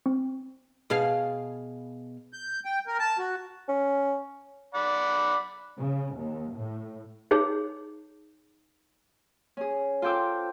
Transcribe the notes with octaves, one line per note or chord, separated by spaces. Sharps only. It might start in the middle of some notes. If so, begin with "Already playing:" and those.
C4
B2 G#4 F5
G6
G5
A#4
A5
F#4
C#4
D5 F#5 B5
C#3
D#2
A2
D#4 G#4 C#5
C#4 G#4
F4 A4 C5 G5 D6 E6